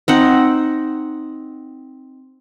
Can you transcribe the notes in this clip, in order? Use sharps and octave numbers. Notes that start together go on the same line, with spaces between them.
C4 D#4 F#5